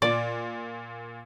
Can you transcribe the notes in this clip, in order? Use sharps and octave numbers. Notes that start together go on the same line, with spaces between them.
A#2 D5